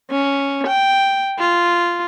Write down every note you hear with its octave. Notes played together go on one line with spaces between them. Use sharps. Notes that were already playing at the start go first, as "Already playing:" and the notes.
C#4
G5
F4